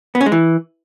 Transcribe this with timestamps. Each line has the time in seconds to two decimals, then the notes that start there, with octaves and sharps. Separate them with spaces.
0.15 B3
0.21 C#4
0.26 G#3
0.32 E3